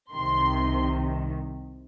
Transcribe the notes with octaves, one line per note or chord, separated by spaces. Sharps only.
C2 C3 D#3 C6